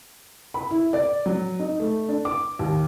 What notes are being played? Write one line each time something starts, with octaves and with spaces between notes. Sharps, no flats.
B5
E4
D5
F#3
D#4
A3
D4
D6
D#2